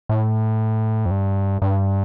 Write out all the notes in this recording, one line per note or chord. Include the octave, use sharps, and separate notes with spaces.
A2
F2
G2
G2